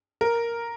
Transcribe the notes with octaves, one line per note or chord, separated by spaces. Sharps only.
A#4